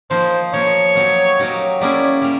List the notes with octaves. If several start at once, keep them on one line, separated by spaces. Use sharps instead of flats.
F3 A#3 D#4 C5
F3 A#3 D#4 C#5
F#3 A#3 D#4 G4
F#3 A#3 D#4 G4
G3 A#3 C#4 E4 G#4 D5
G3 A#3